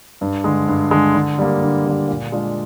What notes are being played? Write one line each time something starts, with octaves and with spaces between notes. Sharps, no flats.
G2
D3 G#3
G2
D3 G#3
D3
G3 A#3
D3
G3 A#3
A#2
G#3 D4 F4